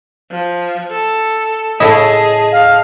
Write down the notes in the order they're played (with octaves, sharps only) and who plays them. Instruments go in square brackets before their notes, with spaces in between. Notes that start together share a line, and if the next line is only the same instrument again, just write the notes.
[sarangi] F3
A4
[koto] A2 C#3 E4 [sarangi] G#4 [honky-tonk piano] D#5 A5
[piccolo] F5